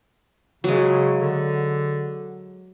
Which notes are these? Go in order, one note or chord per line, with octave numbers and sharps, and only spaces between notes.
C#3 F#3 G#3
D3